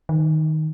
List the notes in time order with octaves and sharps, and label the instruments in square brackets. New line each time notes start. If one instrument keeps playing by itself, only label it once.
[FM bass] D#3